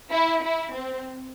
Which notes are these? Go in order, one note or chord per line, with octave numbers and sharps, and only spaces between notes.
E4
E4
C4